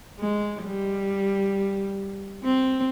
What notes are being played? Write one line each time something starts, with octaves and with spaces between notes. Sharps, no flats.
G#3
G3
C4